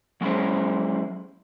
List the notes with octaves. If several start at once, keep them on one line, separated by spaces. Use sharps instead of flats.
F#3 G#3 C#4 E4 G#4 C5